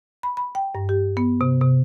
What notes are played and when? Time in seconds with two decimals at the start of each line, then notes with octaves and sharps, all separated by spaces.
0.23 B5
0.37 B5
0.55 G5
0.75 G2
0.89 G4
1.17 B3
1.41 C3
1.61 C3